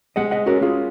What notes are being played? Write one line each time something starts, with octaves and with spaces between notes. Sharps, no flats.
G#3 D#5 F#5
D#5 F#5
C#4 F#4 A#4
F4 G#4